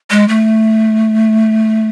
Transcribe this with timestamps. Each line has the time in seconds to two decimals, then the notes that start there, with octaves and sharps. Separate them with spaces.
0.11 G#3
0.29 A3